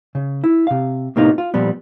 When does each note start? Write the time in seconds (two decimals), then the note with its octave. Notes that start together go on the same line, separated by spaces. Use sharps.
0.15 C#3
0.44 E4
0.67 C3 F5
1.16 A2 C3 A#3 B3 D#4 F4
1.38 F4
1.54 A#2 F3 G3 B3